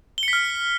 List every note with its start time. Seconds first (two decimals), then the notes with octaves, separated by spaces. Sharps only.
0.18 G7
0.23 C#7
0.28 B6
0.33 F6